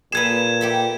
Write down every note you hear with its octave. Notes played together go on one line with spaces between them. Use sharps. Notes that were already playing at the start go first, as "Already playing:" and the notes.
A#2 G#4 A4 B4 G#6 E7
G4 A4 E5